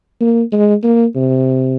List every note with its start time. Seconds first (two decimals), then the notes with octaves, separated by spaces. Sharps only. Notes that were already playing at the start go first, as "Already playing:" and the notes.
0.20 A#3
0.52 G#3
0.83 A#3
1.15 C3